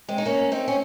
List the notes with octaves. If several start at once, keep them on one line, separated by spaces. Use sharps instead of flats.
G#3 C4
D#4
A#3 C#4
C4 D#4
C#4